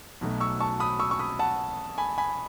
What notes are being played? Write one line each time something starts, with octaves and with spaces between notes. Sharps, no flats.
B1 B2 F#3 A3
C#6 E6
A5 C#6
B5 D#6
C#6 E6
C#6
B5 D#6
F#5 A5
G#5 B5
G#5 B5